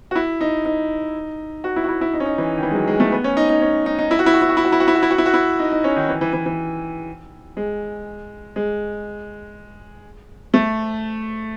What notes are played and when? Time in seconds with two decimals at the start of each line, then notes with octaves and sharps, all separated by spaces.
0.11 F#4
0.15 E4
0.41 D#4
0.65 D#4
1.64 F#4
1.76 E4
1.84 F#4
1.89 E4
2.01 E4
2.13 D#4
2.20 C#4
2.25 D#4
2.38 E3
2.58 D#3
2.63 E3
2.71 G#3
2.75 F#3
2.87 G#3
3.00 A3
3.12 B3
3.24 C#4
3.37 D#4
3.49 D#4
3.62 C#4
3.86 D#4
3.99 D#4
4.11 E4
4.19 F#4
4.26 E4
4.34 F#4
4.42 E4
4.49 F#4
4.57 E4
4.65 F#4
4.72 E4
4.80 F#4
4.88 E4
4.95 F#4
5.03 E4
5.11 F#4
5.18 E4
5.26 F#4
5.34 E4
5.59 D#4
5.72 D#4
5.84 C#4
5.96 D#3
6.09 E3
6.21 E3
6.33 E3
6.46 E3
7.57 G#3
8.56 G#3
10.54 A3